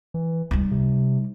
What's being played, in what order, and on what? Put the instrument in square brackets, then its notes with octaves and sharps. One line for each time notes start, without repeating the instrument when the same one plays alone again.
[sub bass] E3
[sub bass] C#2 [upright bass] G3 D#4
[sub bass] C3